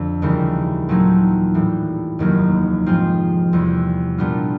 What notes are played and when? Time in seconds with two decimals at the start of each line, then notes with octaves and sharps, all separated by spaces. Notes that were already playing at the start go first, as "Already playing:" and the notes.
Already playing: F2 D3
0.22 D#2 C#3 E3 G3 A#3
0.89 A#2 F#3 A3 C4 D#4
1.54 A2 E3 G3
2.19 F1 D#2 D#3 F#3 A#3
2.86 G#2 F3 G#3 C4 F4
3.53 E2 C3 E3 G3
4.18 A#2 G3 B3 D4 F4